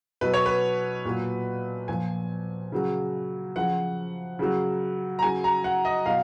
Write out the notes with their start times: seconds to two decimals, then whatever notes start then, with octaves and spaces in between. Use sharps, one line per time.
0.21 B2 F#3 B4
0.33 C#5
0.46 B4
1.05 A#2 F#3
1.88 A#2 F3 G#5
2.72 C#3 F#3
3.56 C#3 F3 F#5
4.39 C#3 F#3
5.19 A#5
5.22 C#3 F#3 G#5
5.44 A#5
5.64 F#5
5.85 D#5
6.06 B2 F#3 F5